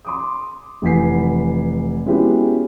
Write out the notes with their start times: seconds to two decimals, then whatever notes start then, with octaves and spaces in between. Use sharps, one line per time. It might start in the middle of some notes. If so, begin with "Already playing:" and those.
0.05 C6 D6 D#6
0.82 F1 E3 F#5 G#5 B6 C7
2.06 G#3 B3 C#4 E4 F#4 G4